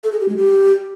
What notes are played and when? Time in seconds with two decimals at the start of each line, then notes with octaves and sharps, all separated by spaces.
0.04 A4
0.12 G#4
0.20 G4
0.28 G#3
0.37 G4